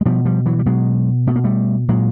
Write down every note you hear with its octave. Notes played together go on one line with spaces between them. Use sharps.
G#3
B2 F3 G3
F3 G3
E3 F#3
G3
B2 F#3 G#3
B2 A3
A#3
G3 A3
A#2 F#3 G#3